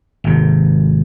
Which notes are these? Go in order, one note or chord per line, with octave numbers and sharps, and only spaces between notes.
G#1 C3